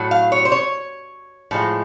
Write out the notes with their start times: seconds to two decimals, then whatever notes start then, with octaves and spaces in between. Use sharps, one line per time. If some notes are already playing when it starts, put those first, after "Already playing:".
Already playing: A2 F#3
0.11 F5
0.32 C#5
0.45 C5
0.52 C#5
1.51 A2 F3 G#3